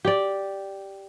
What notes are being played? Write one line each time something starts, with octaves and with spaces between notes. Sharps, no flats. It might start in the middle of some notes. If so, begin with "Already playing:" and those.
G4 D5